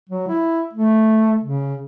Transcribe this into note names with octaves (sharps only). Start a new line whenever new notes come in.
F#3
E4
A3
C#3